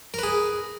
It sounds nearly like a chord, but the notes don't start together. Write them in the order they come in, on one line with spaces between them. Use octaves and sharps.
A#4 B4 G#4